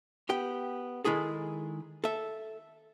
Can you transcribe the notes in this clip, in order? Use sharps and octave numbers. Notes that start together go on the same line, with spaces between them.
B3 G4 G5
D#3 G#3 E4 G#4 A4
A4 E5